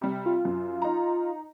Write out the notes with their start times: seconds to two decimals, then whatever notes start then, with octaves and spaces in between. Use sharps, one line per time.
0.01 C3 G3
0.26 F4
0.45 F#2
0.82 D#4 A#5